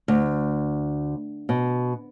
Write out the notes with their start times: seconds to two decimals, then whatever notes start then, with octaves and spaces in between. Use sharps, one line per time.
0.08 D2
1.49 B2